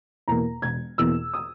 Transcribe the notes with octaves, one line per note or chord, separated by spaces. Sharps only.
E2 B2 A#3 A#5
E1 G#6
E2 B2 A#3 E6
D#6